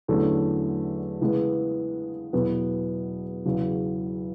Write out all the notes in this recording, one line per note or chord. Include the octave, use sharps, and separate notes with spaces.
E2 D3 F#3 A3 C#4
C#3 E3 G#3 B3
E2 B2 F#3 B3
E2 C#3 F#3